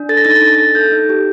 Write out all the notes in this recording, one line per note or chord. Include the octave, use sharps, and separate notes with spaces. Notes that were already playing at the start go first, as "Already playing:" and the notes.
Already playing: D4
A4 A6
A#6
D#4 A6
A#6
D4 A6
A#6
A6
A4
A4 G6
D#4
G4